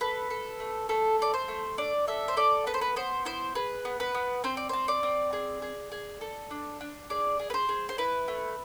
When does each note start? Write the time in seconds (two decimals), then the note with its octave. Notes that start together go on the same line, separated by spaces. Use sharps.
0.01 A4 B4
0.30 A4
0.60 A3
0.89 A3 A4
1.19 A4 D5
1.34 C5
1.48 A3
1.78 D4 D5
2.07 A4 E5
2.28 C5
2.37 A4 D5
2.66 B3 B4
2.74 C5
2.81 B4
2.96 B3 C5
3.25 E4 C5
3.55 G#4 B4
3.85 B3
4.00 B4
4.14 B3
4.44 C4 C5
4.57 D5
4.69 C4 C5
4.88 D5
5.03 C4
5.33 G#4
5.62 G#4
5.92 G#4
6.21 A4
6.51 D4
6.81 D4
7.10 G#4 D5
7.39 G#4
7.50 B4
7.54 C5
7.69 G#4
7.89 C5
7.98 E4 B4
8.28 A3